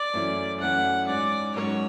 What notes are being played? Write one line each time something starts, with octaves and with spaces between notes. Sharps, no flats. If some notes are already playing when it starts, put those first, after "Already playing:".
Already playing: D5
F#2 E3 A3 C#4 E4
F#2 E3 A3 C#4 E4 F#5
G#2 F#3 C#4 D5
G#2 F#3 C#4 C#5